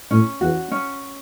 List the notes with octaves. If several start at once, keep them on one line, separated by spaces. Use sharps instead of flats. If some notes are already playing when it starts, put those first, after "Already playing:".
A2 C#4
E2 F#4
C#4